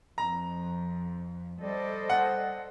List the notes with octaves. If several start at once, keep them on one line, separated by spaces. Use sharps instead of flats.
F2 A#5
G3 A4 C5 D#5
F#5